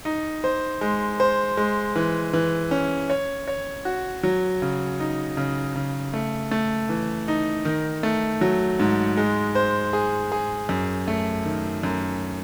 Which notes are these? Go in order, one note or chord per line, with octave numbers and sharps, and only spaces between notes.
D#4
C5
G#3
C5
G#3
E3
E3
C#4
C#5
C#5
F#4
F#3
C#3
D#4
C#3
C#3
A3
A3
E3
D#4
D#3
A3
F#3
G#2
G#3
C5
G#4
G#4
F#2
A3
D#3
F#2